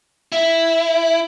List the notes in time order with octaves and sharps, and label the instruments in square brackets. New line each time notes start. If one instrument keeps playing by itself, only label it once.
[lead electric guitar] E4